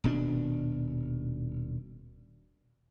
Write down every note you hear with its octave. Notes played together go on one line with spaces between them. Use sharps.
D#1 B2 C#4 D4